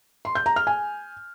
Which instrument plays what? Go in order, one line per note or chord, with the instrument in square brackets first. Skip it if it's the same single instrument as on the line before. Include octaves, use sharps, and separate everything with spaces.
[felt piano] C6
G6
A#5
F6
G#5